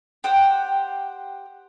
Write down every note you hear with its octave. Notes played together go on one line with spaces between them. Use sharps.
G4 C5 F#5 G5